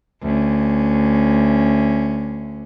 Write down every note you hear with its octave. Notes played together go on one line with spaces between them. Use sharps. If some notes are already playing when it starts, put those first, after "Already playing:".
D2 C#4